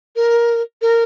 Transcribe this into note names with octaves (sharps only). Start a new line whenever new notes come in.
A#4
A#4